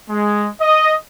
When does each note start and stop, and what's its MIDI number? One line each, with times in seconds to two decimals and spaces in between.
0.10 0.48 56
0.61 0.93 75